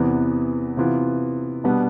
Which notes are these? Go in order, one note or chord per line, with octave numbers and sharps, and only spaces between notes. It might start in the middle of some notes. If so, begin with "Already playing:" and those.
Already playing: E2 C3 E3 B3
C3 E3 B3 F4
B2 G3 B3 D4